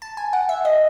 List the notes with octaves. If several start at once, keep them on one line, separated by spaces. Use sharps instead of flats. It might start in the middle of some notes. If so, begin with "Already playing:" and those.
A5
G#5
F#5
E5
D#5